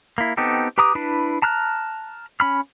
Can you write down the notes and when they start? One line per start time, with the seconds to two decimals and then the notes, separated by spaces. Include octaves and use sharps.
0.18 A#3 E4
0.37 B3 C4 D#4 G4 A4
0.78 G4 B4 A#5 D6 D#6
0.95 D4 E4 B4 B5
1.42 A5 A#5 F6 F#6
2.40 C#4 B5 F6